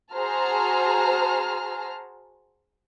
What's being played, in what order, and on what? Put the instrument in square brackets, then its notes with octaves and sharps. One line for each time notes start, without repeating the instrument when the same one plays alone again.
[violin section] F#4 G#4 C5 A5 A#5 F6